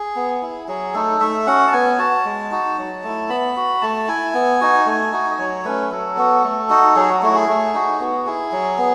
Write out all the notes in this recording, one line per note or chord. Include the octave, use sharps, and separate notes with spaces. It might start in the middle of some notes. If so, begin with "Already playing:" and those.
Already playing: G#4
B3
E4
F#3 G#4
A3 D#4 A4
A3 E5
C#4 F#4 F#5
A5
B3 G#5
F#4 A5
G#3
D#4 F#4
F#3
A3 E4
B3 B5
F#4
A3 A5
E4 G#5
B3
D#4 F#4
A3
D#4 F#4
D#5
F#3 C#5
A3 C#4 B4
F#3 A4
B3 F#4
A3
D#4 F#4
F#3 G#4
F#4
A3 E4 F#4
G#4
A3
D#4 F#4
B3 F#4
E4 G#4
F#3
B3